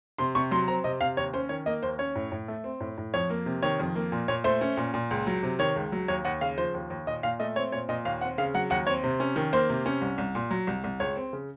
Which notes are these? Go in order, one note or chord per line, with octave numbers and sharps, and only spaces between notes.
C3 C6
C3 C#6
F#3 C6
C4 A#5
C3 D#5
C3 F5
D#2 C#5
C#4 C5
D#3 C#5
A#3 D#5
D#2 C5
C#4 C#5
A2
A2
A3
C4
A2
A2
F2 C#5
A#3
C3
D#3 C#5
F2
A#3
A#2
A#2 C#5
A3 C5
C#4
A#2
A#2
C#2
F#3
C3
D#3 C#5
C#2
F#3
D#2 C#5
D#2 F#5
C#3 F5
F3 C5
D#2
D#2
A#2 D#5
A#2 F5
A3 D#5
C4 C#5
A#2 C#5
A#2 D#5
D#2 F5
C4 F#5
C#3 F5
F#3 F#5
D#2 F#5
C4 C#5
C3
C#4
D#3
A#3 C5
C3
C#4
C2
C2
A#2
F#3
C2
C2
C#2 C#5
C4
C#3